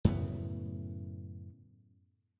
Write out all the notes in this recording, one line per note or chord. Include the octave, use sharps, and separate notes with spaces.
F#2 A2 C#3 B3